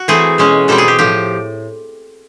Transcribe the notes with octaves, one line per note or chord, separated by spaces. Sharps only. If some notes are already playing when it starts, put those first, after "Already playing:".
Already playing: F#4
E3 A3 C4 G#4
B2 G#3 C#4
B2 G3 C4 A4
G#4
G4
A2 F3 G4